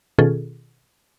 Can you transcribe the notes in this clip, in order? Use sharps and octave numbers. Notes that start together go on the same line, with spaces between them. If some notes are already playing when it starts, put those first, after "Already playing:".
B2 D#3 C#4 F4 G#4 A4